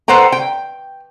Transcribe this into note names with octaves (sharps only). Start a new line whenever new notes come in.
A4 B4 C5 F#5 G5 A#5
G5